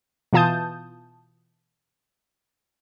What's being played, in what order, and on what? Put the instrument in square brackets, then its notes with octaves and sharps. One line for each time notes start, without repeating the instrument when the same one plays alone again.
[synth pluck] B2 E3 F4 A5 D#6 G6